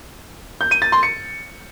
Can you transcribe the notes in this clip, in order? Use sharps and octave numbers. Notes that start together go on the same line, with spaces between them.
G6
D#7
A6
C6
C#7